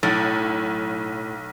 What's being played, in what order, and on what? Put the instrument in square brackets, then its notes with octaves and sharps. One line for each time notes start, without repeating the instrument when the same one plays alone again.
[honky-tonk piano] B1 [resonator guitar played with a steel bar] A2